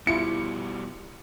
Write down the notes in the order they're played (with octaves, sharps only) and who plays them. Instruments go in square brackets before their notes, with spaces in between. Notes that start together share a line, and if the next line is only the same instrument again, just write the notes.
[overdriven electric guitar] B2 G3 [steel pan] E4 F4 [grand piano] C#7